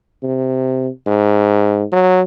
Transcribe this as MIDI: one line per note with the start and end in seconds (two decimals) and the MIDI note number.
0.23 0.89 48
1.07 1.84 44
1.92 2.22 54